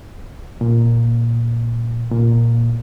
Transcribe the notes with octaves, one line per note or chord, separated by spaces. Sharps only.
A#2
A#2